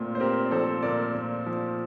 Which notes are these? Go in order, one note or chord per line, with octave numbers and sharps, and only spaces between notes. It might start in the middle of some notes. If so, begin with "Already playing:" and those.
Already playing: A#2 A3 C4 F4
C5
C4 G4 A#4
D5
F3 A4 C5
A#2 A#4 D5
A#2
F3